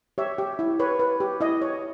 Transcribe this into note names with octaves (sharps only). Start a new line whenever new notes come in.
G4 C#5 E5
G4
E4
B4 C#5
B4
G4
E4 D#5
C#5